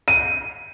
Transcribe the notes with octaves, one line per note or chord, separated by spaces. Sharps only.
D#7